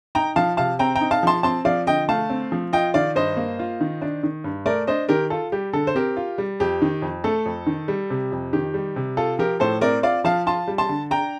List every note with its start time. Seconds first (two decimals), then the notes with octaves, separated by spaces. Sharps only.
0.15 D#4 G5 A#5
0.36 F3 F5 A5
0.57 C3 F5 A5
0.79 C4 G5 A#5
0.95 G5 A#5
1.01 D#4
1.11 F5 A5
1.23 F3 A5 C6
1.43 C4 A5 C6
1.65 F3 D5 F5
1.87 D3 D#5 G5
2.09 A3 F5 A5
2.30 C4
2.52 F3
2.73 F4 D#5 G5
2.94 D#3 D5 F5
3.15 G2 C5 D#5
3.37 A#3
3.59 F4
3.81 D#3
4.02 D4
4.23 D#3
4.44 G2
4.66 A3 A#4 D5
4.87 D4 C5 D#5
5.09 D#3 G4 A#4
5.30 F4 A4
5.52 G3 G4
5.73 D3 A4
5.87 C5
5.95 C4 G4 A#4
6.17 F4
6.38 G3
6.60 F2 G4
6.82 D#3
7.02 F2
7.24 A3 A4
7.46 F2
7.67 D#3
7.88 G3
8.10 C3
8.32 F2
8.53 D#3 G4
8.74 G3
8.96 C3
9.17 F4 A4
9.39 F3 G4 A#4
9.60 A2 A4 C5
9.81 C4 A#4 D5
10.03 F4 D5 F5
10.24 F3 F5 A5
10.47 F4 A5 C6
10.67 G3
10.78 A5 C6
10.89 D3
11.11 D4 G5 A#5